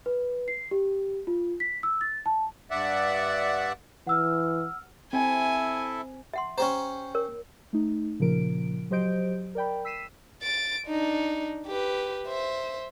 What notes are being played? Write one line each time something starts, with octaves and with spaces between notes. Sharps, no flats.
B4
C7
G4
F4
B6
E6
A6
A5
G2 D5 E5 F#5
E3 F#5 E6 F6
C4 E4 A4 E5 G#5
E5 F#5 C6
C#4 G4 C5 A#5
A#4 C#5
A3 D#4
A#2 C#3 F3 A#4 D7
F#3 G4 C5 D#5 G6 D7
A#4 D5 G5 B5
E6 B6 C7 D#7 E7
A6 D7
D4 D#4
G4 B4
C5 E5